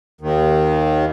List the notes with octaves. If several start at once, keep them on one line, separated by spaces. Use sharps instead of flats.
D#2 D#3